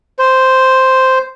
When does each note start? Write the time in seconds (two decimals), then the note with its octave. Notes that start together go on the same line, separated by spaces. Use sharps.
0.19 C5